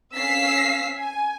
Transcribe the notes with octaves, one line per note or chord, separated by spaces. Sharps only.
C#4 F5 E6 B6 C7
G#5